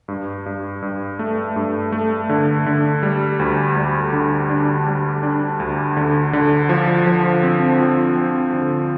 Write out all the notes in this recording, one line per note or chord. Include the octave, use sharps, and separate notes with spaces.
G2
G2
G2
A3
G2
A3
D3
D3
G3
D2
G3
D3
D4
G3
D4
D2
D3
D3
F3
F3
C4
F3
C4
D3